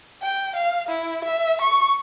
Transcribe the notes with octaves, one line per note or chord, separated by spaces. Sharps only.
G5
F5
E4
E5
C#6